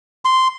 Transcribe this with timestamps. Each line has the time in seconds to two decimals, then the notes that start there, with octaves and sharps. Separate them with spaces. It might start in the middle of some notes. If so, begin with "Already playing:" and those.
0.25 C6